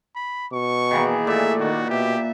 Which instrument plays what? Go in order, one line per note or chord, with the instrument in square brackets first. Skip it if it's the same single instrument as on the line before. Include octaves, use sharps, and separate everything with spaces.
[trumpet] B5
[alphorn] B2 [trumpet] C#6
[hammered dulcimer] D#3 E3 A#3 [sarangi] G#4
[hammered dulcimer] A#2 D5 [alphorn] A3 [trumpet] E5
[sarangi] D#3 [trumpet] F#4
[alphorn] B2 [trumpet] G4 [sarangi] E5